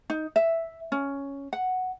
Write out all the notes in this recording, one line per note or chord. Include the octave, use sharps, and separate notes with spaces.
D#4
E5
C#4
F#5